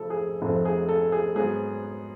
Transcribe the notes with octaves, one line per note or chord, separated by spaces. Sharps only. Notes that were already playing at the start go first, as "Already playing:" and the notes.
Already playing: F1 F2 F3 A4
G#4
F1 F2 F3 A3 A4
G#4
A4
G#4
G#2 F#3 B3 G#4